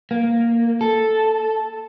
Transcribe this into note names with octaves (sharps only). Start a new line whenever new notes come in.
A#3
A4